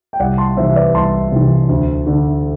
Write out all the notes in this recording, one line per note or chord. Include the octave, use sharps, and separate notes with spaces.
G5
C2 D5 F#5
A5 C6
C3 E3 C5 E5
B4 D5
C2 A5 C6
C3 E3
D2
D3